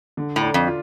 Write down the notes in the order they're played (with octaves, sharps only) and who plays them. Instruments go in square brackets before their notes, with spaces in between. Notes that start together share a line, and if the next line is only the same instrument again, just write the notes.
[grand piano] D3
[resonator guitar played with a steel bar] A2
[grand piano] D4
[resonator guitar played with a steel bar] F2
[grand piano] F4